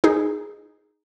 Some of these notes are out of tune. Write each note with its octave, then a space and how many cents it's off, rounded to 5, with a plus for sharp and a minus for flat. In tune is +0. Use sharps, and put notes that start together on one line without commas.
D#4 +0 G#4 +0